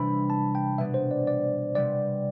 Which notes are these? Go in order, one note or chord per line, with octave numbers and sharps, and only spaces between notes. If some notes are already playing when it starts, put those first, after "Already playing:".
Already playing: C3 E3 G3 D4 B5
A5
G5
B2 G3 B3 D4 E5
C5
D5
D5
C3 G3 B3 D5